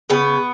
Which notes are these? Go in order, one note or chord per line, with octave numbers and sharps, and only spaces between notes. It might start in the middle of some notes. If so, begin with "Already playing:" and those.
C#3 B3